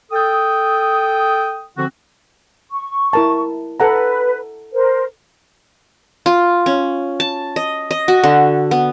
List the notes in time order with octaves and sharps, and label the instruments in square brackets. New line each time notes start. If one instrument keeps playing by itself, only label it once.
[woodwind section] A4 G5 D#6
D3 F3 C4 F#4
[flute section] C#6
[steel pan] E4 A#4 A5
[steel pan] A4 F#5 A#5 [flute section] B4
[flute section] A#4 C5
[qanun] F4
C#4
A5
D#5
D#5
F#4
D3
B3